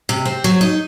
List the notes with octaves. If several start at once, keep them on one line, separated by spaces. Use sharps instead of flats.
C3
C4
F#3
D#4